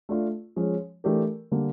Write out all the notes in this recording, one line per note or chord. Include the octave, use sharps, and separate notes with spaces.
A3 D4 F4
F3 G#3 C#4
E3 A3 D4 G4 A#4
D3 G3 A#3